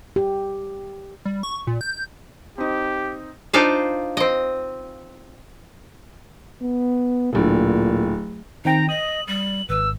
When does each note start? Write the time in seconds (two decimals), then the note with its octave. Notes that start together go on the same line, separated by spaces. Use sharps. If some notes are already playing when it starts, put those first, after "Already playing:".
0.16 G4
1.25 G3
1.43 C#6
1.67 A#2
1.81 G6
2.58 C4 D#4 G4
3.53 D4 D#4 F4 C5 F5
4.17 C4 D#5
6.61 B3
7.33 D1 A#2 D3
8.65 D#3 C4 D#4 G5 A#5
8.89 D#5 D#6 F#7
9.27 G3 F#7
9.69 G#1 B4 E6